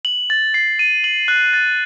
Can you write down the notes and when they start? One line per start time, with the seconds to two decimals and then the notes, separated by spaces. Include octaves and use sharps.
0.05 F#7
0.30 A6
0.54 C7
0.79 D#7
1.04 F#7
1.28 F#6
1.53 A6